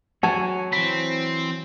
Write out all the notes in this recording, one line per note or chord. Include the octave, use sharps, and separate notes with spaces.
F#3 C#5 G#5 A5
E3 C4 B5